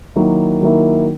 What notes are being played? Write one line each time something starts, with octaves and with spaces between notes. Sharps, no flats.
D#3 F#3 A#3 E4
D#3 F#3 A#3 E4